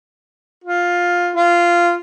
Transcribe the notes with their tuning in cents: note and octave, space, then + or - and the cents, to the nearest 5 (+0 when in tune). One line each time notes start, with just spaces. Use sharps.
F4 +10
F4 -10